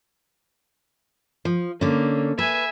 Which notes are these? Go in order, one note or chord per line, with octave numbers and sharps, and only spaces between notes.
F3
D3 A#3 C#4
B4 E5 G#5